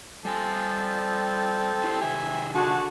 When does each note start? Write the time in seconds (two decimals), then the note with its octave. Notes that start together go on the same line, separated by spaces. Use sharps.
0.25 F3 G3 C4 A4 G#5
1.84 E4 G4 C5
2.01 C3 D#3 G4 E5 G#5
2.54 D3 F#4 G#4 A5